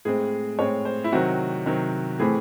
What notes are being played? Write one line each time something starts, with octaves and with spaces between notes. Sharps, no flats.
A2 G#3 C4 G#4
A2 G#3 C4 C#5
C5
E4
C3 D#3 F#3 C4 F#4
C3 D#3 F#3 C4
A2 E3 A3 C4 G#4